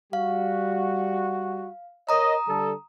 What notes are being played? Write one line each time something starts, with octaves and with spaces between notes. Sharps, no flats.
G3 F#4 F5
A#4 C#5 D#5 A#5 D#6
D3 G3 A4